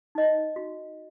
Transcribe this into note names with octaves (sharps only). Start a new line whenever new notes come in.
D#4 D#5
F#4